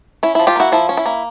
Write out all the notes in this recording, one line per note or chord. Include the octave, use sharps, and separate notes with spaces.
C#4 E4
F3 E4
F4 G4
A#3 E4 F#4
F3 E4
C#4
E4
A#3